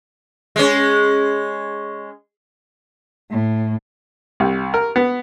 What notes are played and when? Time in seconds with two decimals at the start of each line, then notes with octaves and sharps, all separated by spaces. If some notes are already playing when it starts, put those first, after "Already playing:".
0.56 G#3 C#4
3.31 A2
4.40 C2
4.74 A#4
4.96 B3